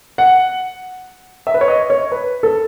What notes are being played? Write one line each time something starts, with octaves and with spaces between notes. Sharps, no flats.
F#5
E5
B4
C#5
D#5
C#5
B4
A4